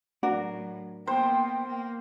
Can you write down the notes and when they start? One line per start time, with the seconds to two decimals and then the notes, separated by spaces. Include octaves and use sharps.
0.23 A2 F#3 D4 F#4 A#4
1.07 A#3 B3 C5 G5
1.67 A#3